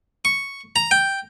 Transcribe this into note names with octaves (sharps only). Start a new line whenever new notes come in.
C#6
A#5
G5